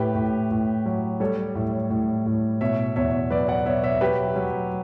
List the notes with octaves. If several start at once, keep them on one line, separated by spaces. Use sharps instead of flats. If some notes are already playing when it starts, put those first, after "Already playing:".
Already playing: A2 G4 B4
A2
A2
F#3
G3 A4 C#5
A2
A2
A2
B2 C#5 E5
E2 C#5 E5
F#3 B4 D5
D5 F#5
B2 C#5 E5
C#5 E5
F#3 G4 B4
F#3